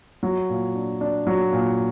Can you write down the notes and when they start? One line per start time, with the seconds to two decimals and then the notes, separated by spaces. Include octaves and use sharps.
0.23 F#3
0.49 A#2
0.75 D4
1.01 D4
1.27 F#3
1.52 A#2